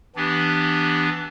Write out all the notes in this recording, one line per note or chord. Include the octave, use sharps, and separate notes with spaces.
E3 B3 D4 G4